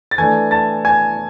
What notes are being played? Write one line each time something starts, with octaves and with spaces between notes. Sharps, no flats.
A6
E3 A3 D4 G#5 G#6
A5 A6
G#5 G#6